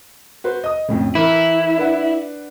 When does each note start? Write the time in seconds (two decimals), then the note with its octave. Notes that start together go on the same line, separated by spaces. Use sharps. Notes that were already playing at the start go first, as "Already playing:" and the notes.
0.44 F#4 B4 C5
0.64 D#5 D#6
0.88 F2 A2 C#3
1.15 E3 E4 A#4
1.77 D4 B4 F#5